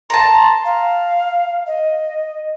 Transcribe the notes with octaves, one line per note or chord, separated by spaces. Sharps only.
A5 A#5 C6
F5
D#5